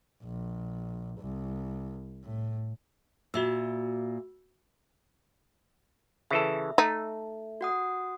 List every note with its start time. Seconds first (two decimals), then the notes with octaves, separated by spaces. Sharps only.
0.24 A#1
1.20 C2
2.24 A2
3.34 A#2 F#4 E5 E6
6.31 C#3 E3 A4 E5
6.78 A3 D#4
7.61 F#4 F#5 D#6